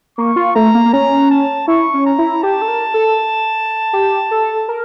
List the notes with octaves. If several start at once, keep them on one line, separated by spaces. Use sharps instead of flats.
A#3 C#6
F4
A3 A#5
A#3
A#3
C#4 A#5
A5
E4 C#6
C#4
A#5
E4
G4 A5
A4
A#4
A4
G4
A4
A#4